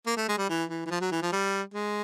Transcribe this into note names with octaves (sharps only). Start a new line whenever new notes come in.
A#3
A3
G#3
G3
E3
E3
E3
F3
F#3
E3
F3
G3
G#3